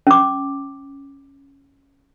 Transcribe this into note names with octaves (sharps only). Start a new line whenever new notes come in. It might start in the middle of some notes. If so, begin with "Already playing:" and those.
C#4 D6